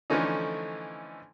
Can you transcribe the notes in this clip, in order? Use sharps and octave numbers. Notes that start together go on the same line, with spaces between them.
D3 E3 F3 A3 C#4 D#4